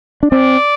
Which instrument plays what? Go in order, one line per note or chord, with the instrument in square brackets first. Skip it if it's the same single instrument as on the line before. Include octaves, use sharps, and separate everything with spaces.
[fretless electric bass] D4
[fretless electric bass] C4 [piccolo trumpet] D5